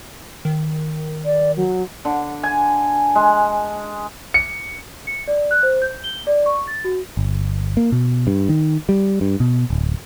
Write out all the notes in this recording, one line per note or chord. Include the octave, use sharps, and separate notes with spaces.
D#3
D5
F#3
D3
G#5
G#3
C#7
C#7
D5
F#6
C5
G6
G7
D5
C#6
A6
F#4
G1
A#3
B2
G2
D#3
G3
G2
B2
D1